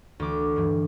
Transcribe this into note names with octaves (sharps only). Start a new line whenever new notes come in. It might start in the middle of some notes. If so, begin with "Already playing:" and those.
D2 E3 D6
G2 E3 G3